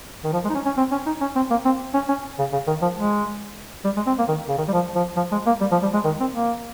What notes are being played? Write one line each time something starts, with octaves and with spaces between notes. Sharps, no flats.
D#3
F3
G#3
D#4
C#4
C#4
C4
C#4
D#4
C#4
C4
A#3
C4
C#4
C#4
C#3
C#3
D#3
F3
G#3
G3
G#3
C4
A#3
D#3
C#3
D#3
G3
F3
F3
F3
G#3
A#3
G3
F3
G3
G#3
D#3
C4
A#3